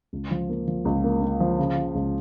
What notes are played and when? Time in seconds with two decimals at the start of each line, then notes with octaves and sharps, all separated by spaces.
0.13 C#2
0.31 F3
0.49 A#3
0.67 F3
0.85 C#2
1.04 A#3
1.22 A#3
1.40 F3
1.59 C#3
1.77 C#3
1.95 C#2